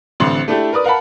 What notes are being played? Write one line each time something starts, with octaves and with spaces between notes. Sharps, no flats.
A1 D3 C4 C6 F#7
A3 D4 E4 G4
A#4 B4 D5 D#6
A#4 F5 F#5 A5 B5